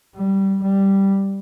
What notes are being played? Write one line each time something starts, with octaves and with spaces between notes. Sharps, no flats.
G3
G3